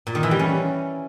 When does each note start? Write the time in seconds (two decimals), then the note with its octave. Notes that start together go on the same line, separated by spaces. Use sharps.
0.07 A#2
0.15 D#3
0.23 E3
0.31 G3
0.39 C#4